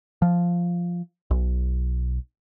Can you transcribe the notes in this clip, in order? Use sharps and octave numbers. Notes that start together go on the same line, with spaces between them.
F3
B1